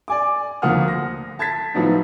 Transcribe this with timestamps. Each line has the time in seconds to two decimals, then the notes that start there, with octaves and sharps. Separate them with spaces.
0.08 D5 G#5 D6
0.62 D2 F3 A#3 F#5 D#6 F6
0.88 A#6
1.39 A5 G#6 A6 B6
1.74 A2 F3 F#3 B3 D#4